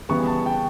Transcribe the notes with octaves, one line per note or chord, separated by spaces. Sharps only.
C#3 E3 G3 B3 C#6
A5
G5